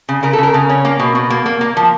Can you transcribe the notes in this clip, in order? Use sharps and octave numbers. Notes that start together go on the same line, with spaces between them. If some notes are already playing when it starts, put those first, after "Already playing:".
C#3
C#3 A#4
A4
C#3 A#4
C#3
C#4
A#3
B2
B2
A#3
A#3
A#3
F3